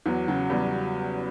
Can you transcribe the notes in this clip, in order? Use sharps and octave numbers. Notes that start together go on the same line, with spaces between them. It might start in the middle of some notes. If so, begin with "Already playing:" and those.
E2 F#3
C#3 F#3
E2 G3